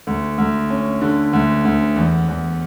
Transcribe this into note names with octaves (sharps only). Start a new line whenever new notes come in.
D2
D2
C#4
D3
D2
D2
E2
E2